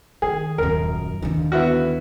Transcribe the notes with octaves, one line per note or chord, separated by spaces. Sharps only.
D#3 G#4
D#1 F#2 A#4
D#2 D3
B3 E4 F#4